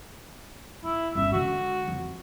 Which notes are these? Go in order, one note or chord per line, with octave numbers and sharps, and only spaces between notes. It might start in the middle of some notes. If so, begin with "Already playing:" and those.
D1 E4
G1 C#4 E5
D3 G#3 F#4
F2